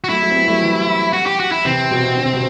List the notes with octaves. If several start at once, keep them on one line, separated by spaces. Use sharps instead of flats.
F#4
F#3 A3 E4
F#3 A3
C4
G3 B3
F#3 A3
E3 G3
F#4
G4
F#4
E4
C3 E3 C4
B2
D3
C3
B2